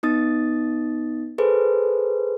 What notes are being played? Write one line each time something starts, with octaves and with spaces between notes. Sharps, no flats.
B3 D#4 D#6 A6
G#4 A4 B4 C5